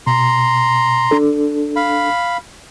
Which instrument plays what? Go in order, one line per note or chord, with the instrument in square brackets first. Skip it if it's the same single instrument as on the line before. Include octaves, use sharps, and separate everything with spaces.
[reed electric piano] B2 [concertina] A#5 C6
[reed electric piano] D4 A4
[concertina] F5 B5